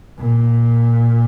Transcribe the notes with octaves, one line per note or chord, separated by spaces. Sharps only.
A#2